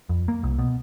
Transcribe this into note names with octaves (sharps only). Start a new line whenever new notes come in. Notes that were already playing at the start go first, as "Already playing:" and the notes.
F2
A#3
C2
B2